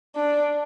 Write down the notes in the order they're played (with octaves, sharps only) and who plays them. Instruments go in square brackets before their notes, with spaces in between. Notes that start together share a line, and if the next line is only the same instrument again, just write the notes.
[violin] D4